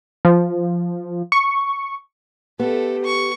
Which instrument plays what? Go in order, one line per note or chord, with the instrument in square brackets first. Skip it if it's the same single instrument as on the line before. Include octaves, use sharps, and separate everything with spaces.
[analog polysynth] F3
C#6
[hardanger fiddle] A3 A4 [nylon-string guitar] B3 [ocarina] G4
[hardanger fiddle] C#6